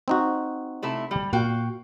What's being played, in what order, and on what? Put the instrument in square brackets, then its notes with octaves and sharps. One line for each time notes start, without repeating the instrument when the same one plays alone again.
[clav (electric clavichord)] C4 D#4 F#4
[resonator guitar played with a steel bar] C3 A3 E4
G3
[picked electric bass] A#2 [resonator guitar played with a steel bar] F#4 F5 G5